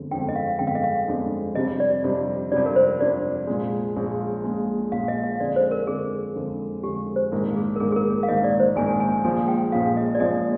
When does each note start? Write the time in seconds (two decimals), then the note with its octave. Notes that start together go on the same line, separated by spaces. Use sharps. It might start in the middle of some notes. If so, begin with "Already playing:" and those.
Already playing: G1 F2 D3 G#3
0.11 G1 F2 D3 G#3 D4 G5
0.29 D#5
0.36 F5
0.59 G1 F2 D3 G#3 D4 G5
0.67 F5
0.75 D#5
0.84 F5
1.08 G1 F2 D3 G#3 D4
1.55 F2 C3 G3 D4 D#5
1.68 D#5
1.80 D5
2.04 F2 C3 G3 D4
2.51 F2 C3 G3 D4 D5
2.66 A#4
2.76 C5
2.99 F2 C3 G3 D4 D5
3.47 A#1 A#2 G#3
3.96 A#1 A#2 G#3
4.44 A#1 A#2 G#3
4.92 A#1 A#2 G#3 F5
5.08 D#5
5.23 F5
5.40 F2 D3 G#3 D5
5.56 C5
5.71 A#4
5.87 F2 D3 G#3 G#4
6.36 F2 D3 G#3
6.84 F2 D3 G#3 G4
7.16 C5
7.32 A#1 G#2 D#3 A#3
7.57 G#4
7.76 A#4
7.80 A#1 G#2 D#3 A#3 G#4
7.92 G#4
7.96 A#4
8.23 F5
8.28 A#1 G#2 D#3 A#3 D#5
8.44 D5
8.60 C5
8.75 A#1 G#2 D#3 A#3 G#5
9.00 G#5
9.24 A#1 A#2 F3 G#3 G#5
9.48 G5
9.72 A#1 A#2 F3 G#3 F5
9.97 D#5
10.15 D5
10.20 A#1 A#2 F3 G#3 D#5